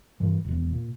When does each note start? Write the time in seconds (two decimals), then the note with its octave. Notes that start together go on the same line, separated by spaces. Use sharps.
0.20 G2 E3
0.44 D#1 E2
0.71 A#2